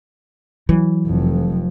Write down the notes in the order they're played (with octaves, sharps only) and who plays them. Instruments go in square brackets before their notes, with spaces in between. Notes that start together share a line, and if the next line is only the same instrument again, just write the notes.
[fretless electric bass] E3 [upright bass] F#3
[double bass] F1 F2